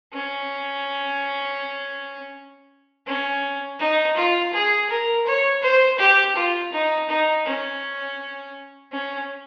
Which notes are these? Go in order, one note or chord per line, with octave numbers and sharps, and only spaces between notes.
C#4
C#4
D#4
F4
G#4
A#4
C#5
C5
G4
F4
D#4
D#4
C#4
C#4